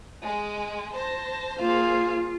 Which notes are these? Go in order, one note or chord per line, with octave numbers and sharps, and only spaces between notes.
G#3
C5 A5 A#6
A#3 F4 G#4 F5